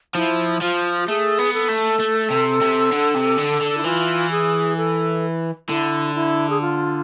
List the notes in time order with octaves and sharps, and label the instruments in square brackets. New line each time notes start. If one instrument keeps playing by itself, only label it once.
[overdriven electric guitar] F3 [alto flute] E4
[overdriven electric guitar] F3 [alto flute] F4
[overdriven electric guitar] A3 [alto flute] G#4
[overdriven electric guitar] B3
[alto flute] A4
[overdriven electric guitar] A3
A3
C3
C3
D3
C3
D3
D3
[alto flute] E4
[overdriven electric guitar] E3 [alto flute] F4
[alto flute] G#4
A4
[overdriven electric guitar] D3 [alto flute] E4
[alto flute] E4
G#4
F4